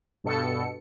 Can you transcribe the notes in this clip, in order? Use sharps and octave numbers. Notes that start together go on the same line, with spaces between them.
G2 B2 A4 C#7